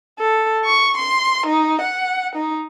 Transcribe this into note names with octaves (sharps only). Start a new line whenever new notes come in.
A4
C#6
C6
D#4
F#5
D#4